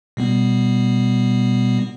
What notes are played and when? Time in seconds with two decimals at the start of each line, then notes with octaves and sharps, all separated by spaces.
0.17 B2 G3 B3